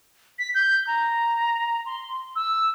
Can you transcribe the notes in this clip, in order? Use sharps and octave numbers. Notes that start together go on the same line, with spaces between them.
B6
G6
A#5
C6
E6